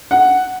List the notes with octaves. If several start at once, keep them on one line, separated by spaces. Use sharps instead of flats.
F#5